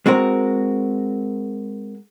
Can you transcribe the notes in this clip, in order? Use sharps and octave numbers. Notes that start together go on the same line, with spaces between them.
G#3 C4 F#4 A#4